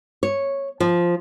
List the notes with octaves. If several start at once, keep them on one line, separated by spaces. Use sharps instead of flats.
C#5
F3